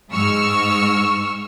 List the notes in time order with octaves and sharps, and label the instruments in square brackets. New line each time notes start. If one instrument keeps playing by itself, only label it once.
[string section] G#2 C#6 E6 F6